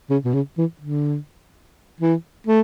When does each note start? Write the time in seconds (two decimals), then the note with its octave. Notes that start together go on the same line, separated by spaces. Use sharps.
0.10 C#3
0.25 B2
0.34 C#3
0.58 E3
0.81 D3
2.00 E3
2.47 A3